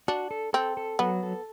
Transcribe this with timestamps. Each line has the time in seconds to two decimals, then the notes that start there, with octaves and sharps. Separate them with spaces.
0.08 D4 F#4
0.31 A4
0.53 C4 A4
0.77 A4
0.99 F#3 B3
1.23 A4